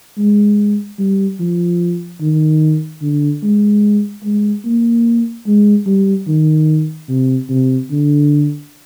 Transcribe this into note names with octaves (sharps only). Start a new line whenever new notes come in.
G#3
G3
F3
D#3
D3
G#3
G#3
A#3
G#3
G3
D#3
C3
C3
D3